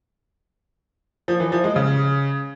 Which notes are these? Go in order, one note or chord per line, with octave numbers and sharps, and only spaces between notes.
F3
E3
F3
G#3
C#3